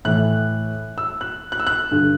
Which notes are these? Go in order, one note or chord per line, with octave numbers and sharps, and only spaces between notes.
A2 E3 F#6
E6
F#6
F#6
E6
F#6
G2 D3